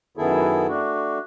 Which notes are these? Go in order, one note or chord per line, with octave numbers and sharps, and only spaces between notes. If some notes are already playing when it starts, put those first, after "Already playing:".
F#2 D#3 B3 E4 G#4 A4
A3 D4 F#4